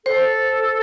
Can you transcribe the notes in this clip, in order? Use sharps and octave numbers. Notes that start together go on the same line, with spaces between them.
A4 C5